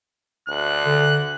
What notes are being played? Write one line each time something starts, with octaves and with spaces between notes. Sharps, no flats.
D2 F#6
D3